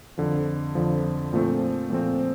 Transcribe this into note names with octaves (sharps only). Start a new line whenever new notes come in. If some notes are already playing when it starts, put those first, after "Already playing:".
F2 D3 F3
F2 D3 F3
A#2 F3 A3 C4
A#2 F3 A3 C4